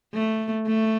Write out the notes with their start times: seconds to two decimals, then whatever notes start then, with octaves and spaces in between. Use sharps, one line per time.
0.14 A3
0.68 A3